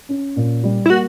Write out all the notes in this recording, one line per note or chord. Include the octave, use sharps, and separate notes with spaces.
C#4
A#2
G3
E4
A#3 F#4